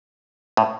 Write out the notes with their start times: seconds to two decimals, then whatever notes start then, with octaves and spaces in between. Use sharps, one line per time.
0.57 A2